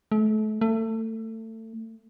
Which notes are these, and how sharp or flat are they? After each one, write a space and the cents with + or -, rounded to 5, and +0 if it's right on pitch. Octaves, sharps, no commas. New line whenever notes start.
A3 -35
A3 +25